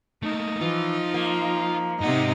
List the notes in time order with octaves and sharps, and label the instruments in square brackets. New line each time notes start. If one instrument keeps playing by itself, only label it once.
[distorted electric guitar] A3 A#3 [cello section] D#4
[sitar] E3 [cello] F3 [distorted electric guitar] F4
[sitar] A#3
[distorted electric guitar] G#2 F#5 [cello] C3 D#4